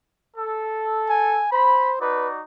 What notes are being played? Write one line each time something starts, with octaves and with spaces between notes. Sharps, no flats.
A4
G#5
C5 B5
D#4 F#4 B4 D5